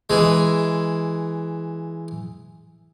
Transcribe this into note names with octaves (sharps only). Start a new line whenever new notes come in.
E3 G#3